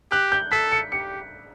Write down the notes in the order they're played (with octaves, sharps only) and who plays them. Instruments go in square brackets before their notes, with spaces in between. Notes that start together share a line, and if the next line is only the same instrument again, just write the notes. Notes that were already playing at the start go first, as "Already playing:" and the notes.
[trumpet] G4 [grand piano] F#6
[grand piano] G6
[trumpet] A4 [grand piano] B6
[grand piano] C#7
[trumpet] G4 [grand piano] C#7